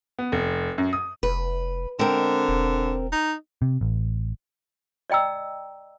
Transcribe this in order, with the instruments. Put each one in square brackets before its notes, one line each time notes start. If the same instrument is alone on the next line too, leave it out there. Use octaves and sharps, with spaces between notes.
[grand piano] B3
F1
F#2
D#6
[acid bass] F1 [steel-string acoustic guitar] B4
[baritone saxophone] D3 [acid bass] G#3 [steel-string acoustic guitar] C4 A#4
[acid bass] E1
[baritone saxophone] D#4
[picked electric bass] C3
A1
[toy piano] D5 D#5 G5 A#5 E6